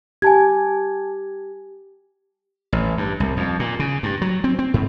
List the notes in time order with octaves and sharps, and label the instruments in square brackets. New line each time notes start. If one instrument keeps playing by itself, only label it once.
[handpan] G4 [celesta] G#5 A5 G#6
[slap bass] A1
G2
C2
F2
A#2
C#3
G2
F#3
C4
C4
G#2